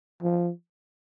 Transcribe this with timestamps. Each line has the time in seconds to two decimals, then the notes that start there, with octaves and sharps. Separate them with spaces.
0.22 F3